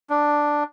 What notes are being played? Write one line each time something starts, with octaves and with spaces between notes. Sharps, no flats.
D4